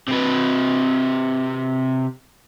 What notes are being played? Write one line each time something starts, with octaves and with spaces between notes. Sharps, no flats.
C3 B4